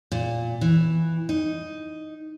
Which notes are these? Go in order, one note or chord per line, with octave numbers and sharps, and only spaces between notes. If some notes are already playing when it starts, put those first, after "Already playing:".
A#2
E3
D#4